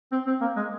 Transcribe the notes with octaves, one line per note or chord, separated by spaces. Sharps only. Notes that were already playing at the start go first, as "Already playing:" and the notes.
C4
C4
A#3
G#3